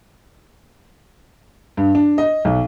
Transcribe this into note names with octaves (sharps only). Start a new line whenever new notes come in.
G2
D4
D#5
B1